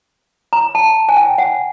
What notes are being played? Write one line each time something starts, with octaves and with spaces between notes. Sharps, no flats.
A#5
A5
G#5
G5
F#5